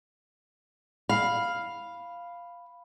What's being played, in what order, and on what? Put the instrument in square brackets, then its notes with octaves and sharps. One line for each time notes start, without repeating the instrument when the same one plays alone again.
[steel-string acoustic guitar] F5 [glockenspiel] B5